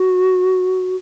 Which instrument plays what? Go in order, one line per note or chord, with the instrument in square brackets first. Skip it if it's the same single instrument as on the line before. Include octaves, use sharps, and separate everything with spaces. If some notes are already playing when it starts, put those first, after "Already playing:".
Already playing: [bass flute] F#4